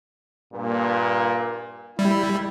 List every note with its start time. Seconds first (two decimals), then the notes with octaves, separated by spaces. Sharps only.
0.53 G2 A#2
1.99 G3 E4